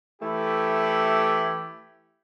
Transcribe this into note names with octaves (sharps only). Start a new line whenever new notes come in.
E3 A3 E4 G4